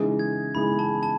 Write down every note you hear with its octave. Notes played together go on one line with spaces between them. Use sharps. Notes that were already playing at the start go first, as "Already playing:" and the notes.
Already playing: C#3 E3 G#3 D#4 G#4
G#6
C#3 E3 G#3 D#4 G#4 B5
A5
A5